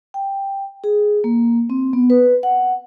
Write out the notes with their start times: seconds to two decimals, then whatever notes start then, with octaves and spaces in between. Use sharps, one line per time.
0.14 G5
0.84 G#4
1.24 A#3
1.70 C4
1.93 B3
2.10 B4
2.43 F#5